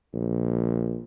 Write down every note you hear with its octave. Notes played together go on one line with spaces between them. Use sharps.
A#1